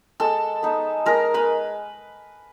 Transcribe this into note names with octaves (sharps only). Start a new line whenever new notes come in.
G#3 A4 A5
B3 D#4
G#3 A#4 A#5
B4 B5